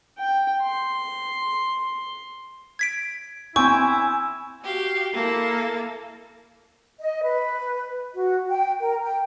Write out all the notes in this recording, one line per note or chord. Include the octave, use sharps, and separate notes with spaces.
G5
C6
G#6 B6 D7
C4 E4 G5 G#5 C#6
F#4 G4 F5
A#3 E4 A4
D#5
B4
F#4
G5
A#4
G5